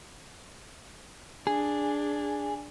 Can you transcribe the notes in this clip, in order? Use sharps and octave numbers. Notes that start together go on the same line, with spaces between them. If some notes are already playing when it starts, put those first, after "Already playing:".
D4 G#4